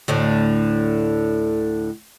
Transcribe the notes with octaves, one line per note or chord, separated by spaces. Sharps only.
D2 A2 D3